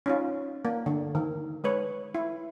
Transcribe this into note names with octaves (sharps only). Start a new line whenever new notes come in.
C#4 D#4 F4
A#3
D3
D#3
G#3 B4 C#5
E4